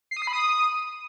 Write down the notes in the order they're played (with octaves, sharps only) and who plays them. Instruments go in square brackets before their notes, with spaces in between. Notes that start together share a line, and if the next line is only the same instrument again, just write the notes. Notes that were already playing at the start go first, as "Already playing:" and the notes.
[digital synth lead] C7
D#6
C7
B5
D#6